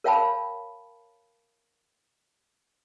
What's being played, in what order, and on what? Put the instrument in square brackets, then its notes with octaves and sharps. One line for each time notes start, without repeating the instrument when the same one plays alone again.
[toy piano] A#4 C#5 F5 G5 A5 B5